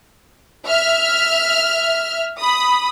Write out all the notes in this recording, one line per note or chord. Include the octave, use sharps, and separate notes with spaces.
E5 F6
B5 D#6